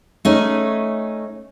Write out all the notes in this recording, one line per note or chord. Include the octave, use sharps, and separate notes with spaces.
A3 C#4 D#4